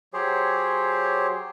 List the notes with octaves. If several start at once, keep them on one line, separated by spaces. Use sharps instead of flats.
F#3 G4 G#4 C5 C#5